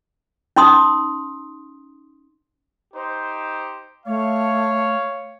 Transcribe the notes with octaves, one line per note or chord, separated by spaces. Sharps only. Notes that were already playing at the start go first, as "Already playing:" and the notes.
C#4 D#4 C6 D#6
D#4 G4 C5
A3 C#5 F5